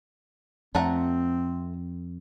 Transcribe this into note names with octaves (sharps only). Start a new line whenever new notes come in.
F2 A3 C4 F#5 A#5